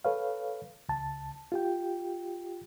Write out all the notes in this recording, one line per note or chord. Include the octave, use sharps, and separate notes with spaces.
A4 B4 C#5 F5
C#2 A5
F4 G4 G5